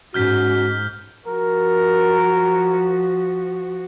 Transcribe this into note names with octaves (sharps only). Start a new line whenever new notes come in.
G#2 G#3 C#4 F#4 F6 G6 B6
F3 F#4 A#4